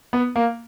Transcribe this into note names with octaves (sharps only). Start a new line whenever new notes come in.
B3
A#3